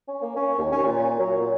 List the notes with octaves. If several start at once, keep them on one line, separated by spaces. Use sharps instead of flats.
C#4
A#3
C#4
D#2
C#4
A#2
F#3
A#2